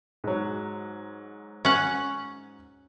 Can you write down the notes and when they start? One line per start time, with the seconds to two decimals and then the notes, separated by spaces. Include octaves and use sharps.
0.24 G#2 F#3
1.65 C#4 F#5